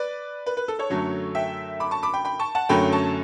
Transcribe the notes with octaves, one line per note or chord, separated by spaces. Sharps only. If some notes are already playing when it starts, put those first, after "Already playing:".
Already playing: B4 D5
B4
B4
A4
A4 C#5
F#2 D3 F#3 A3
E5 G5
B5 D6
A5 C#6
B5 D6
G5 B5
G5 B5
A5 C#6
F#5 A5
F#2 D3 F#3 A3 C#4 G5 B5
A5 C#6